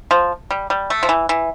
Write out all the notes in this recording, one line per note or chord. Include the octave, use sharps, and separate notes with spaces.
F3
G3
G3
A3
F3
E3
E3